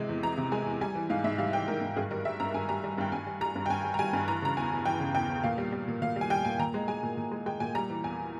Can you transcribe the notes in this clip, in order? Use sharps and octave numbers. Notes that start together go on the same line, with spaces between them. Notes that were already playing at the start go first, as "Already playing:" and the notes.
Already playing: C3 E3 G#3
E2
E3 A#5
C3
G#3 G#5
E2
G3 G#5
E3
G#2 F5
G#2 E5
G3 F5
E3 G5
G#2 A#4
G#2
G2 G#4
G3 A#4
G3 E5
G2 A#5
G2 G#5
G3 A#5
G3
G2 G5
G2 G#5
G3
G3 A#5
G2
G5
G2 G#5
G3
A#5
G3 G#5
G2
E3 A#5
C#3 A#5
E2 G#5
E2
E3 G5
C#3
E2 G5
E2
A#2 F5
G3
G3
A#2
A#2 F5
G3
G#5
G3 G5
A#2 G#5
A#2 A#5
G#3
G#3 G#5
A#2
A#2
G#3
G#3 G5
A#2 G#5
G3 A#5
E3
E2 G#5